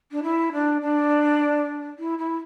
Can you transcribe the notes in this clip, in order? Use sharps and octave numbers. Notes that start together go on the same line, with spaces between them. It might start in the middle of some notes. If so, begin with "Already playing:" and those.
D4
E4
D4
D4
E4
E4